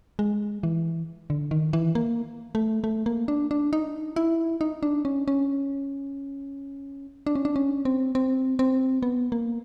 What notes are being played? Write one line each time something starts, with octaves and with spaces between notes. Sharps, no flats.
G#3
E3
D3
D#3
E3
A#3
A3
A3
A#3
D4
D4
D#4
E4
D#4
D4
C#4
C#4
D4
C#4
D4
C#4
C4
C4
C4
B3
A#3